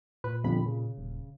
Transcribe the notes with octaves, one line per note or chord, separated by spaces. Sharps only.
A#2 B4
G1 F2 B5
C#3
D#1